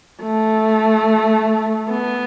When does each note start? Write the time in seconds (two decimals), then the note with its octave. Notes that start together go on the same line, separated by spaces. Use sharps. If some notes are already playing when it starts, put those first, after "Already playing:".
0.23 A3
1.90 B3